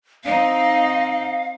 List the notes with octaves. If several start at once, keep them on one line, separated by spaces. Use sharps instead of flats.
C4 D#4 F5